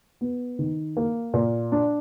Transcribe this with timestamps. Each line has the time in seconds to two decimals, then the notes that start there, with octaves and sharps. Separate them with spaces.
0.21 B3
0.59 D#3
0.97 A#3
1.34 A#2
1.72 D4